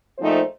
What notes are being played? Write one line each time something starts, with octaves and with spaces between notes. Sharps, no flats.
A#2 F3 A3 C4 D#4 C5